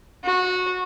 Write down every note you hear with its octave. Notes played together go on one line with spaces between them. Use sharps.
F#4